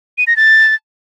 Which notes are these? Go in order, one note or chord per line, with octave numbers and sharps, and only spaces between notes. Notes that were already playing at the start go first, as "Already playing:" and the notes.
D#7
A#6
A6